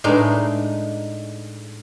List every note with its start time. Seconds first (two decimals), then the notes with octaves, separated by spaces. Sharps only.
0.04 A2 G#3 D4 D#4